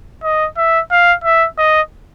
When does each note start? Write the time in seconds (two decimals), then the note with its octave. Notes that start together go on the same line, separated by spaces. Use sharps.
0.23 D#5
0.57 E5
0.91 F5
1.24 E5
1.58 D#5